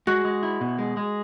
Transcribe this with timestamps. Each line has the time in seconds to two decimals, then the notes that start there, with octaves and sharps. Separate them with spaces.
0.07 G#3 F#4
0.25 G#3
0.43 E4
0.61 B2
0.79 G#3
0.97 G#3